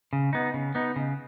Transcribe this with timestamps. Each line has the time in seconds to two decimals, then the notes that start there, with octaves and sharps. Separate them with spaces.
0.13 C#3
0.33 B3 D#4
0.54 C#3
0.75 B3 D#4
0.96 C#3